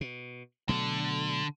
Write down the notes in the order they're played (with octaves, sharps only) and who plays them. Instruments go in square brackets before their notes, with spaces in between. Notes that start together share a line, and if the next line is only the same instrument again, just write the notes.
[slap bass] B2
[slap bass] B2 F#3 A3 [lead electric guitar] D3